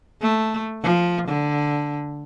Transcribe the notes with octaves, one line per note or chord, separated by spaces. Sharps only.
A3
F3
D3